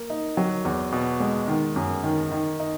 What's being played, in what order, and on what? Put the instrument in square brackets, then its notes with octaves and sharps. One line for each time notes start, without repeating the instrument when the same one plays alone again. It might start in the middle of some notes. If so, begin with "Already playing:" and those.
Already playing: [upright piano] A#3
D#4
F#3
E2
B2
G#3
D#3
F#2
D#3
D#3
D#4